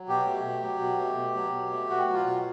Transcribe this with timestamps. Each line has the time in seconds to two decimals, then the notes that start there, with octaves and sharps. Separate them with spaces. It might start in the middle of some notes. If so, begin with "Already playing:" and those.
Already playing: F#3
0.08 B2 G4
0.26 A3
0.45 B2
0.63 F#3
0.80 B2
0.98 A3
1.16 B2
1.35 F#3
1.53 B2
1.72 A3
1.90 B2 F#4
2.07 F#3
2.13 F4
2.26 B2